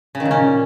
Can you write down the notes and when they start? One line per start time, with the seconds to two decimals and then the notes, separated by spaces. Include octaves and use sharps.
0.15 C#3
0.20 D#3
0.25 A#2
0.31 C#4